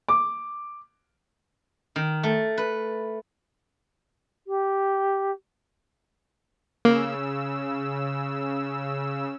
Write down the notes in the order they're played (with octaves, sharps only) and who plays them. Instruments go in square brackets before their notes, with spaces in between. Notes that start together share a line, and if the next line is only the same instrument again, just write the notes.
[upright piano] D6
[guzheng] D#3
A3
B4
[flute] G4
[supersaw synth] C#3 E6 [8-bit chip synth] A#3